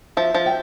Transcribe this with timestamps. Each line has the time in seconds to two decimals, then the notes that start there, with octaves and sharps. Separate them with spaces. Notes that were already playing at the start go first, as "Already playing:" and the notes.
0.17 F3 E5
0.34 F3
0.46 G5